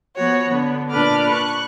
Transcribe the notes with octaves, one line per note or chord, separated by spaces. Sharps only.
F3 B3 F#4 C#5
D3 B3
A#2 D4 B4 D6 F6
C#6 F#6